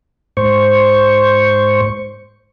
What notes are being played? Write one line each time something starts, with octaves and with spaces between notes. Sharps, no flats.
G#2 C5 C#6